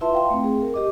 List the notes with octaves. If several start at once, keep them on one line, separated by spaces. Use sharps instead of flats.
E4 F4 B4 E5 A5 C6
F5 G5 C6
A3 C4
G#4
A#4
G4 D#5 D6